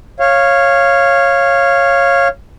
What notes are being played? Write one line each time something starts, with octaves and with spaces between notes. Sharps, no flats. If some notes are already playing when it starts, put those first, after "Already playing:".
C#5 F5